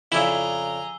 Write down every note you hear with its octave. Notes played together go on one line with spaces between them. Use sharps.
F2 C#3 E4 G#4 D5 A#5 E6 G7